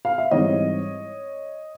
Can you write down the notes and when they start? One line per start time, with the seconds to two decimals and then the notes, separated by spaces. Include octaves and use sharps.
0.05 F5
0.18 E5
0.31 G#2 E3 G3 C4 C#5 D#5